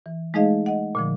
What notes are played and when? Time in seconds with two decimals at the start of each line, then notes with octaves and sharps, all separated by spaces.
0.06 E3
0.34 G#3 A3 D#4 G#4 D#5 F5
0.66 D#5 F#5
0.95 A#2 D3 F3